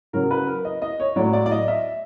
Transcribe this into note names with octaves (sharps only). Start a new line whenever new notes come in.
C#3 F#3 A#4
B4
A#4
D#5
D#5
C#5
A2 F#3 D5
D5
D5
D#5
E5